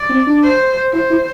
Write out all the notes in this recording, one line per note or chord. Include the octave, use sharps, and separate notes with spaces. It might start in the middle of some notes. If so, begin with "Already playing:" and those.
Already playing: D5
C4
D4
C5
E4 C5
E4